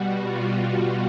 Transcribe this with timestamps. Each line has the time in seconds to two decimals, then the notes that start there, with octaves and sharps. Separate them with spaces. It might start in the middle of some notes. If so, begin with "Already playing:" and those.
Already playing: B2 G3 F#4
0.23 F4
0.62 F#4